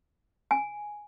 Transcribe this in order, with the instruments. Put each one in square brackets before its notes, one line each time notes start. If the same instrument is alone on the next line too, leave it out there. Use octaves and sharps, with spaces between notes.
[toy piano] G#5